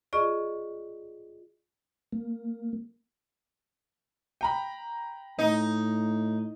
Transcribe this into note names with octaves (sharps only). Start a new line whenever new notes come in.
F4 G#4 D5 D#5 C#6
A#3
G5 A#5 B5
A2 D#4